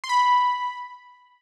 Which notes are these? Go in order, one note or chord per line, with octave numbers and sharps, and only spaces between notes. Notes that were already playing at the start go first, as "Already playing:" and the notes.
C6
B5